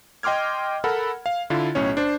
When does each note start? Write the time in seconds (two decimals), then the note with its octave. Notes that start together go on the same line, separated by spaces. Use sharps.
0.23 D#5 G5 C6 D6 F6 G#6
0.84 A4 A#4 F#5 B5
1.26 F5
1.50 D3 E4 F4
1.75 B1 A2 C#4 C#5
1.97 D4 C5